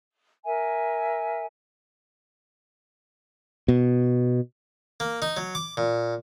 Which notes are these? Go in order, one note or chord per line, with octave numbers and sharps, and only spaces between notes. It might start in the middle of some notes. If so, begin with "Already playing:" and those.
A#4 E5 G#5
B2
A#3
D#4
F#3
D6
A#2